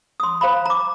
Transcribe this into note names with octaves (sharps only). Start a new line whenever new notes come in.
C6 D#6
C5 F5 A#5 B5
A#5 D6